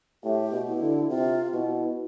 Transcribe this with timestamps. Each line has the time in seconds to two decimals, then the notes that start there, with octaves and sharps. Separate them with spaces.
0.24 A2 G4
0.52 B2
0.67 E4
0.81 D3
1.09 C3 F4
1.53 B2 E4